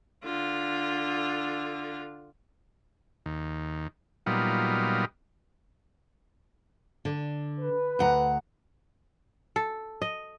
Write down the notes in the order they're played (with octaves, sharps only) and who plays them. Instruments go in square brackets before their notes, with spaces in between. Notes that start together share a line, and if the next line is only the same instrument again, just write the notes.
[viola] D3 F4
[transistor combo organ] D#2
A#2 F#3 G3 B3 D#4 F4
[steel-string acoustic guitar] D3
[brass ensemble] B4
[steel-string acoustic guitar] D2 F#5 A#5
[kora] A4
D#5